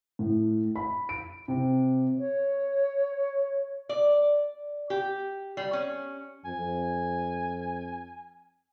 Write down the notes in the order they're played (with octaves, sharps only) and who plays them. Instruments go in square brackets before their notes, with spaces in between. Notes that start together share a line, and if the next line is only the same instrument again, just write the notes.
[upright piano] A2
B5
D7
C3
[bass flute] C#5
[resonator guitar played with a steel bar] D5
G4
G3
C#4
[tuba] F2 [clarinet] G#5